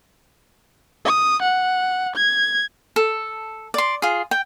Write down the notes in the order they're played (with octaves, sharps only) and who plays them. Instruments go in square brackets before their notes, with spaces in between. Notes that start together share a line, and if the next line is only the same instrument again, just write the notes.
[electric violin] D#6
F#5
G#6
[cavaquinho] A4
D5 C6
F4 G#4
G5